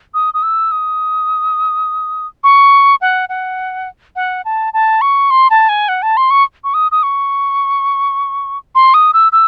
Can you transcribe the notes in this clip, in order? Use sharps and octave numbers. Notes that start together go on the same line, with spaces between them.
D#6
D#6
E6
D#6
C#6
F#5
F#5
F#5
A5
A5
C#6
C6
A5
G#5
F#5
A5
C6
C#6
C#6
D#6
D#6
C#6
C6
D#6
E6
E6